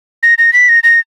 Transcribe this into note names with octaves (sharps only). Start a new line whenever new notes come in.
A#6
A#6
B6
A#6
A#6